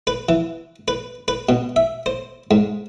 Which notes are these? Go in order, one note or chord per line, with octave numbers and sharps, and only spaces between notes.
B4
E3
B4
B4
B2
E5
C5
G#2